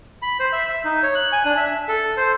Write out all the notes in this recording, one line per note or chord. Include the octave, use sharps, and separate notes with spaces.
B5
C5
E5
E5
D#4
C#5
F#6
G#5
D4
E5
A4
C5